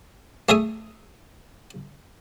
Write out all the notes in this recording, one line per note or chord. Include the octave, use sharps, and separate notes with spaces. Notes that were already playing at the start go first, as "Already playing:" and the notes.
A3 G#4 E5 D#6